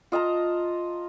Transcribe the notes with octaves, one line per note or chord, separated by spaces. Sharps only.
F4 D#5 A5 A#5